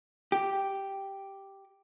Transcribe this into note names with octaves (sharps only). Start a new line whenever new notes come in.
G4